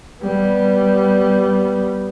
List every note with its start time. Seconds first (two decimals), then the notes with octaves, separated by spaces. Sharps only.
0.22 G3 B3